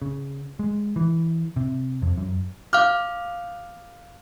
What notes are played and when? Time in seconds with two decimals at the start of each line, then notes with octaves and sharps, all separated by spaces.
0.02 C#3
0.59 G#3
0.96 E3
1.56 C3
2.02 F2
2.17 F#2
2.73 F5 D6 F6